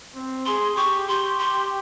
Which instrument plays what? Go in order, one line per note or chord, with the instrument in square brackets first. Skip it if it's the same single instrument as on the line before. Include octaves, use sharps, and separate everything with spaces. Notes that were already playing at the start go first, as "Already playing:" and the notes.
[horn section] C4
[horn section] G#4 [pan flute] C6
[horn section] G4 [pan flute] C#6
[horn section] G4 [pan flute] C6
[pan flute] C6